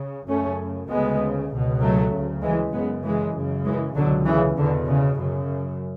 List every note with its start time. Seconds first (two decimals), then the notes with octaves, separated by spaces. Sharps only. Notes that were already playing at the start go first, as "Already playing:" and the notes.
Already playing: C#3
0.27 F#2 C#3 A3 C#4
0.89 D2 C#3 G#3 B3
1.51 C#2 B2
1.81 F#3 A3
2.11 D2 C#3
2.42 E3 G#3
2.72 F#2 C#3 G#3 B3
3.03 E3 G#3
3.34 F#2 C#3
3.64 E3 G#3
3.95 C#2 B2 D3 F#3
4.25 C#3 E3
4.56 E2 B2 D3
4.87 C#3
5.17 F#2 C#3